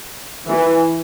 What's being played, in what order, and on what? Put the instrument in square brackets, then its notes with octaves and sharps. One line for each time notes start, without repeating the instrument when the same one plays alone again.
[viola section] E3